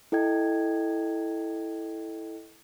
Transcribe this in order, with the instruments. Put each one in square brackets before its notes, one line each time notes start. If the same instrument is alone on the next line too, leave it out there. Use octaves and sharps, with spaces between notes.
[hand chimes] E4 A4 D#5 G5 G#6